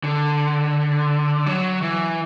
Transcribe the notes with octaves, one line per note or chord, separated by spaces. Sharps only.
D3
F#3
E3